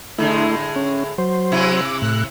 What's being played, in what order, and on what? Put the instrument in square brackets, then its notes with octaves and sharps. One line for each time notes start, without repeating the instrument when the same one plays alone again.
[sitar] A2 D3 G#3 [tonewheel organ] A3 E4
[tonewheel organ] C#4
F#3 C5
[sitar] C3 E4
[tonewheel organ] D6
A2 F#6